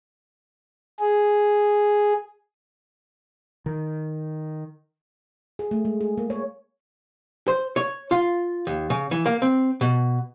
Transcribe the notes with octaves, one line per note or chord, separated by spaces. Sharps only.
G#4
D#3
G#4
A3
G#3
G#4
A#3
C#5
C5
C#5
F4
D#2
C#3
E3
A#3
C4
B2